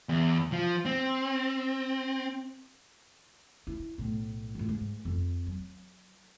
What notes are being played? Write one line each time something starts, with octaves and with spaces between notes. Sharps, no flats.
E2
F3
C4
E4
B1 A2
F2 A2
G#2
F2 C4
F#3